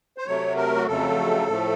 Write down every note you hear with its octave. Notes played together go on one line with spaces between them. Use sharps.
C5
C3 F#3 A3 C#5
A#4
F#4
F2 C#3 F#3 A3 A4
A2 F3 A3